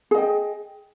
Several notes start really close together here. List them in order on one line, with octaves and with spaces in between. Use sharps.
G#4 D#5 G5